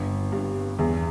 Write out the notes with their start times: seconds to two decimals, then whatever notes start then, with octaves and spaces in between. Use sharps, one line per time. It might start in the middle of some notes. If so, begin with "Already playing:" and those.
Already playing: G1
0.32 G2
0.79 E2